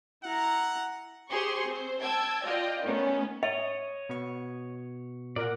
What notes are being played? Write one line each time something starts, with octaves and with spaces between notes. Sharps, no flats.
E4 F#5 A#5
G4 G#4 C5 C6 C#6
C4 C5
G5 A5 E6 G#6
F4 D5 D#5 G5
D#3 A3 B3 C#4
C#5 D#5 E5
B2 B3 C#6
A#2 A#4 D5 F#5